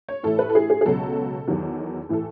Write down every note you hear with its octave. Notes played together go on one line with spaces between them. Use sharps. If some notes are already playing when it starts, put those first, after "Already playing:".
C#5
A2 E3 A3 A4
B4
A4
G#4
G#4
G#4
C#2 B2 F#3 A4
E2 D#3 F#3
A2 E3 A3 A4